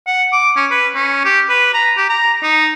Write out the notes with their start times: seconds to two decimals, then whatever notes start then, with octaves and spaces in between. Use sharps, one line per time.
0.07 F#5
0.33 D6
0.56 C#4
0.71 B4
0.95 C#4
1.25 G4
1.49 B4
1.74 A#5
1.97 G4
2.09 A#5
2.43 D#4